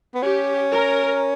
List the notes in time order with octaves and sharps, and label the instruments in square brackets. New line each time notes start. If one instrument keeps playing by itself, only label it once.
[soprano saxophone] B3
[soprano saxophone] C#4 [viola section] G4
[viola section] A#4